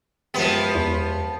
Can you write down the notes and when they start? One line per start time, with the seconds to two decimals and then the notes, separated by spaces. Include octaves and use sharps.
0.34 C#2 F#2 C3 F3 B3
0.75 E2